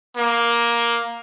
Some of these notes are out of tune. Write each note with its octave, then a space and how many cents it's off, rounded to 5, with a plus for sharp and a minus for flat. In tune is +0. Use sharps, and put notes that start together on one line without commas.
A#3 +10